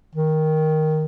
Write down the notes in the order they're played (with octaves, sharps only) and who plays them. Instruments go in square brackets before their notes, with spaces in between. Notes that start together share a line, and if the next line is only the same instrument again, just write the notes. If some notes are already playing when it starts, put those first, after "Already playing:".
[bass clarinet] D#3